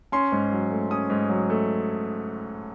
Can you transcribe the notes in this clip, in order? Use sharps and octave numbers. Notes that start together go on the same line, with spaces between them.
C#4 C6
G#2
F#3
A3
C#4 D#6
G#2
F#3
A3